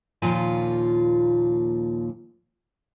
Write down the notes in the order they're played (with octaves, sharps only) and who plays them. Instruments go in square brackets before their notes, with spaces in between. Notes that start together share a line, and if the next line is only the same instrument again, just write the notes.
[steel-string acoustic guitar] D#2 A#2 F3 F4